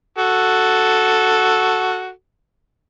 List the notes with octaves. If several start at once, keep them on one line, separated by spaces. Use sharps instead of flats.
F#4 A4